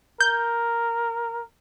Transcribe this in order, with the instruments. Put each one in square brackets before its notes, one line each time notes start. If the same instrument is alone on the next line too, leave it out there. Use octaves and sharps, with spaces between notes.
[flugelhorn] A#4 [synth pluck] G6